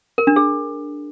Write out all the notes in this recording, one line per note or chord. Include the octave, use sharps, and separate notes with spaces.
A#4
D4
G#4